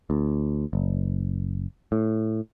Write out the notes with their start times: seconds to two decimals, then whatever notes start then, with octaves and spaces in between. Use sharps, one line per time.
0.10 D2
0.73 F#1
1.92 A2